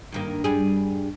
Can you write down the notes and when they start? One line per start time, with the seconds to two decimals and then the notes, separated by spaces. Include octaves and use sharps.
0.12 G2 D#3 A#3
0.44 G2 G3 G#4